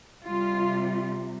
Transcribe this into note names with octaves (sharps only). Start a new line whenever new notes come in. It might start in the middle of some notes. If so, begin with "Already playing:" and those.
C3 G3 F4